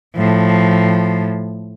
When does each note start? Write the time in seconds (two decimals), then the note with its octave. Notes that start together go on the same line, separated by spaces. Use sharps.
0.15 A2 F3